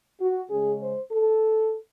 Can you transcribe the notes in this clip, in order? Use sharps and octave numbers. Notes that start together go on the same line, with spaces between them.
F#4
C#3 G#3 C#4 G#4
C5
A4